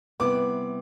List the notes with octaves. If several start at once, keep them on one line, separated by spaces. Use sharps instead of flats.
C3 G3 B3 E4 B4 D6